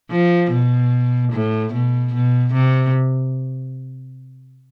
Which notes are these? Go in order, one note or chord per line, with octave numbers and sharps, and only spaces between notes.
F3
B2
A2
B2
B2
C3